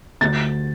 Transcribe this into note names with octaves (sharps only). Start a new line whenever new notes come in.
D2 A6